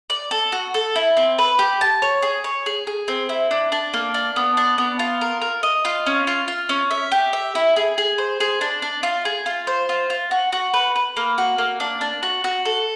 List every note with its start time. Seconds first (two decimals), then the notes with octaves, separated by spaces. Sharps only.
0.10 D5
0.31 A4
0.52 F#4
0.74 A4
0.96 E4
1.17 C4
1.38 B4
1.59 G4
1.81 A5
2.02 C#5
2.22 G#4
2.44 C#5
2.66 G#4
2.87 G#4
3.08 C4
3.29 E4
3.51 D4
3.72 D4
3.94 A#3
4.14 D4
4.36 B3
4.57 D4
4.78 B3
4.99 F4
5.21 A#4
5.42 A#4
5.63 D#5
5.85 F4
6.06 C#4
6.27 F4
6.48 F4
6.69 C#4
6.91 E5
7.12 G4
7.33 E5
7.55 E4
7.76 G#4
7.98 G#4
8.18 C5
8.40 G#4
8.61 D4
8.82 D4
9.03 F4
9.25 G#4
9.46 F4
9.67 C5
9.89 F4
10.10 F4
10.31 F#4
10.52 F#4
10.74 B4
10.96 B4
11.17 A#3
11.38 F#4
11.58 A#3
11.80 D4
12.01 D4
12.23 F#4
12.44 F#4
12.65 A4